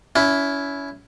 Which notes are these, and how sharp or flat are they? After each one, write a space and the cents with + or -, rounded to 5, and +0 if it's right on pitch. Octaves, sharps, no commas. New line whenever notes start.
C#4 +30 E4 +0